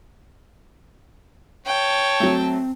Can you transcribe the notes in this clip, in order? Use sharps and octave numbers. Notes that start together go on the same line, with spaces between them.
C#5 G5 A5
F#3 A3 C4